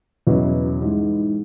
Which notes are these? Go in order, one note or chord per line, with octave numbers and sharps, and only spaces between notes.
E2 B2 F#3 C#4 E4
G#2 E3 G#3